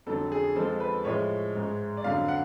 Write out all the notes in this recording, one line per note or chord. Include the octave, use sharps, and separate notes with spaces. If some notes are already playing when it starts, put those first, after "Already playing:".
F2 D3 F#3 A4
G#4
F2 F3 G#3 A4
B4
A2 F3 G#3 C#5
G#2 G#3
D5
F2 D3 F#3 F5
F#5